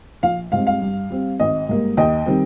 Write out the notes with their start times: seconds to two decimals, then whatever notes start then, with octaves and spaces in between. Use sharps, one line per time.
0.23 A#1 F5
0.52 G#2 G3 C4 F5
0.67 F5
0.82 G2
1.10 G3 C4
1.39 G#1 D#5
1.69 G#2 G3 A#3
1.97 D#2 D#5 G5
2.26 D#3 G3 C4